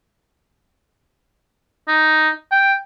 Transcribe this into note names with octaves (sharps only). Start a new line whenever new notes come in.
D#4
G5